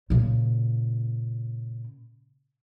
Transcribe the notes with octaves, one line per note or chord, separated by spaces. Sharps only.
A#2 C#3